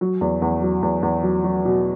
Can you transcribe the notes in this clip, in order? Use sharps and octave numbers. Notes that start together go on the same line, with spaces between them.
F#3
E2
E2
F#3
E2
E2
F#3
F#3
B2